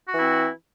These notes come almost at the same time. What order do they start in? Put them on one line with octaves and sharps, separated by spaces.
F#4 E3 E4 C4